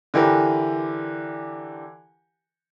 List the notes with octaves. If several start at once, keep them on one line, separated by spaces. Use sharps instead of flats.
D3 E3 G4 A#4